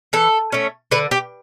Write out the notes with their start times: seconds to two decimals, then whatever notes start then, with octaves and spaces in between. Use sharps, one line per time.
0.13 E3 A4
0.52 A3 C#4
0.91 D3 B4
1.11 G4